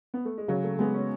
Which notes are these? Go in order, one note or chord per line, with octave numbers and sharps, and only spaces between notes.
B3
A3
G#3
C#3 F#3
A3
G#3 B3
C#4